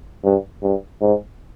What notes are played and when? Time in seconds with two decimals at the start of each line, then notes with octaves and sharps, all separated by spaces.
0.24 G2
0.62 G2
1.01 G#2